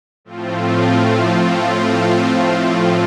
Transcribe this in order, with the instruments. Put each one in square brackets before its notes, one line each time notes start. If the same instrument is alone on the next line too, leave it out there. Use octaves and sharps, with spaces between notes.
[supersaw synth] A2 F3 A3 C4 F4